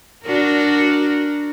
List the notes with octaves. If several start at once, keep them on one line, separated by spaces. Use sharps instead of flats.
D4 F#4 A#4